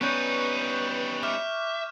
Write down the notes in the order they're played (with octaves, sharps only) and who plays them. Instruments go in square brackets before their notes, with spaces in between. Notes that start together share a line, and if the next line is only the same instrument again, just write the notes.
[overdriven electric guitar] G3 D#4 [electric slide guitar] B3 C#4 [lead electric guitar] B4 [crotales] C#6 F#6 G6
[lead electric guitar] E5 [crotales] D6 F6 E7